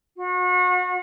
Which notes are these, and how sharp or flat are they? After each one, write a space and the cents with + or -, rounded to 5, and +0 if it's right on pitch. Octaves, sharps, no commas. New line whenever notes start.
F#4 -35